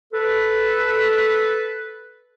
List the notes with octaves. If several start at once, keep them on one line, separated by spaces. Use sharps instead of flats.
A4 B4